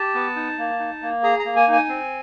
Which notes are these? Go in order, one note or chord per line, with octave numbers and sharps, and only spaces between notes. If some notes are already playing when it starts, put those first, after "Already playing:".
Already playing: G4 A5
B3
D#4
A#3
D#4
A#3
G#4 A#5
A#5
A#3
G#5
D#4 G#5
C4